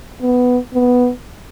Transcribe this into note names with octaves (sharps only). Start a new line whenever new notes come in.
B3
B3